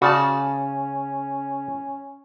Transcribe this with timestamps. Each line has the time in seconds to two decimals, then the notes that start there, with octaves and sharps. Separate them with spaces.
0.02 C#3 C#4 F#4 D5 A5